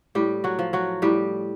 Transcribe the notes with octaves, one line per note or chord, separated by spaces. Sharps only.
A2 G3 G4
F#3 F#4
F3
F#3 F#4
A2 G3 G4